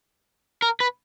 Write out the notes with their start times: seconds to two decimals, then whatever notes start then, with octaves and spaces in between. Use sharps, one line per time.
0.62 A#4
0.80 B4